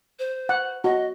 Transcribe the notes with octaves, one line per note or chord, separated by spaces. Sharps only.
C5
F#5
F#4 D#5